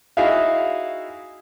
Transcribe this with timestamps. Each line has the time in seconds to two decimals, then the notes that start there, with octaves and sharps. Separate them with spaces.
0.17 D#4 E4 F#4 G#4 E5 F5